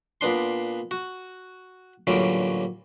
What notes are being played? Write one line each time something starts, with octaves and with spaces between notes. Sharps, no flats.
A#2 B3 D4 C6
F#4
A1 A#2 D3 F#3 G3 D6